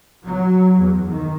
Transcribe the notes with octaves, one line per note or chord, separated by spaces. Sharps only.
F#3
E2
D#3